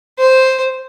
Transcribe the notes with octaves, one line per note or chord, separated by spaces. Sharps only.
C5